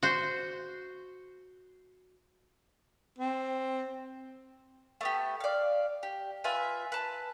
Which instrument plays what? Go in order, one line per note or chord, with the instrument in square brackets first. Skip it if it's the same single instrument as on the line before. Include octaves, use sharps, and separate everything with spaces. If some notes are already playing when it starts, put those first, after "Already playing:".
[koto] F#4 C5
[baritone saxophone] C4
[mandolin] A3 B3 G4
D5 F5
G4
F4 B4 E5 G#5
B4 A5